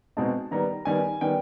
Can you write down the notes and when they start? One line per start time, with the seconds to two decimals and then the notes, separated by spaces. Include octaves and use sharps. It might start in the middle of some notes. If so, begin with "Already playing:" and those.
0.17 B2 G#3 C4 D#4 A5
0.51 D#3 G3 B3 A#5
0.85 D#3 G3 B3 G#5
1.21 D#3 G3 B3 G5